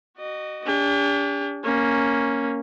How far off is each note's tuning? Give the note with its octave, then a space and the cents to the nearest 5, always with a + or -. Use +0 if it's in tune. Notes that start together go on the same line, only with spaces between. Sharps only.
F#4 +25 D#5 -25
D4 -40 G4 +40
A#3 +0 C#4 +0